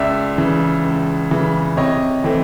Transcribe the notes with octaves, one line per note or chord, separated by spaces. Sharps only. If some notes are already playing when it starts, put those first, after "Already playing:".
Already playing: C#2 D5 E5
C#3 E3
C#2
C#3 E3
C3 C#5 D#5
E3 A3 C4